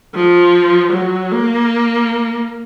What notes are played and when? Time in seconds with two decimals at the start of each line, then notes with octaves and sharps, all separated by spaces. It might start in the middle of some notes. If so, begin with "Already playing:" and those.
0.14 F3
0.92 F#3
1.31 A#3